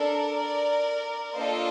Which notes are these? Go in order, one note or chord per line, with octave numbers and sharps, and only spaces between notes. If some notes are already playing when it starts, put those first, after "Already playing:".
Already playing: D4 A4 A#4 D5
A#3 D4 F4 A4 C5 D#5